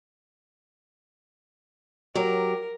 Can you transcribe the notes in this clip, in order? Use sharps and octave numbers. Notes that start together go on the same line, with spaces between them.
F#3 G4 A#4